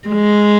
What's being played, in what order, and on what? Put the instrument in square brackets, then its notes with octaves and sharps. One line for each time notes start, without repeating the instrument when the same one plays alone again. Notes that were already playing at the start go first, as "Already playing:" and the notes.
[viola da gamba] G#3